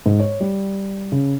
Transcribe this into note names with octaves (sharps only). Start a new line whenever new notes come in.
G#2
C#5
G3
C#3